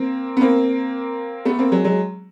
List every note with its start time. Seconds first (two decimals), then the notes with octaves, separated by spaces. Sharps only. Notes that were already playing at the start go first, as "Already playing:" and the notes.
Already playing: A#3 C4
0.37 B3
0.41 A#3 C4
1.45 A3 B3
1.58 A#3 C4
1.72 F#3 G#3
1.84 F#3 G#3